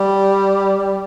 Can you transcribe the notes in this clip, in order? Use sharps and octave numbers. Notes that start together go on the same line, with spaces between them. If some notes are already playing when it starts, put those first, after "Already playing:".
Already playing: G3